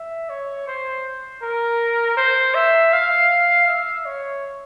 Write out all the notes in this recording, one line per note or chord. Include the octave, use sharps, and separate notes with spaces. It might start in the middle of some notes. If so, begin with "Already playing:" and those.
Already playing: E5
C#5
C5
A#4
C5
E5
F5
E5
C#5